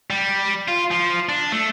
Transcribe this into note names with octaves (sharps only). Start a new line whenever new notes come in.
G3
F4
F3
D4
A3